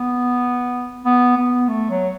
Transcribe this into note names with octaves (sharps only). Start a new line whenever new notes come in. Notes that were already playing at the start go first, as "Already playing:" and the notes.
Already playing: B3
B3
B3
A3
F#3